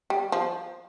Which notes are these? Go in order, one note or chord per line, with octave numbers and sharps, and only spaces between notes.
G3
F3